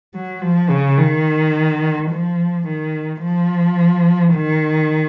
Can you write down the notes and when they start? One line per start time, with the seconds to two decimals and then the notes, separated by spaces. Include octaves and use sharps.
0.14 F#3
0.42 F3
0.69 C#3
0.98 D#3
2.11 F3
2.67 D#3
3.23 F3
4.35 D#3